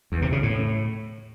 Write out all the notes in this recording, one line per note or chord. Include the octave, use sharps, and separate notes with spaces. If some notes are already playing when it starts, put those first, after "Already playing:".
E2
C3
C#3
A2